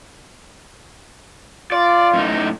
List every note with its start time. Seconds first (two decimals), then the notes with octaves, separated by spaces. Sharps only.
1.72 F4 D5
2.13 F#2 A2 D#4